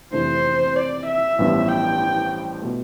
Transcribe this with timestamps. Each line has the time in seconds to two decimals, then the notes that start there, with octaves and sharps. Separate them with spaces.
0.13 F2 C3 E3 A3 D4 C5
0.76 D5
1.07 E5
1.38 A1 G2 F3 B3
1.69 G5
2.62 B2 A3